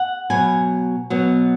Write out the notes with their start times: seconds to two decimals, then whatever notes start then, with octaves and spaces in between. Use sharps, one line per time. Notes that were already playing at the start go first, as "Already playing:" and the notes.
Already playing: F#5
0.30 B2 F#3 B3 G#5
1.10 B2 F#3 B3